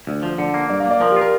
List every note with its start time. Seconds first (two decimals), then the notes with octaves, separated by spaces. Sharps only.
0.07 D2
0.23 F3
0.38 D3
0.54 A#3
0.69 G2 D5
0.80 F5
0.86 A#3 D5
1.00 F3 A#4
1.11 G4
1.16 F4 A#4